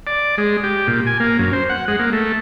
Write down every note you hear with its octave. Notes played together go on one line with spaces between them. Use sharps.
D5
G#3
G4
A#2
G#5
A#3
F#2
C5
F#5
G#3
A#3
A3